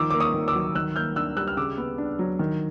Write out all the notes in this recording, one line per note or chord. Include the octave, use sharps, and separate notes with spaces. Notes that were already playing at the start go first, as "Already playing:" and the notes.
Already playing: D#3 F3 D6 E6
A#3 D6
C#6 D#6
D#3
D6 E6
F#3
D#3 E6 F#6
A#3 F6 G6
D4 E6 F#6
G3 E6 F#6
F6
C#3 D6 E6
B3
D4
F#3
D#3